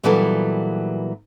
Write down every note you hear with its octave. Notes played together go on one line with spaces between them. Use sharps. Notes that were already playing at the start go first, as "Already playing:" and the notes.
A#2 E3 F#3 G3 B3 A4